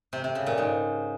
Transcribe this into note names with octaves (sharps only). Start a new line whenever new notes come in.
C3
C3
C#3
A#2
G#2